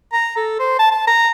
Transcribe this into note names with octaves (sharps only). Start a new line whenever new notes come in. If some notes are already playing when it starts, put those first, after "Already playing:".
A#5
A4
C5
A5
A5
A#5